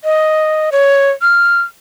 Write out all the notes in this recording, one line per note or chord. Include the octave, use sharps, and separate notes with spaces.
D#5
C#5
F6